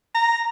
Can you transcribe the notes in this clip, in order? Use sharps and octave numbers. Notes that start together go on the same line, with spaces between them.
A#5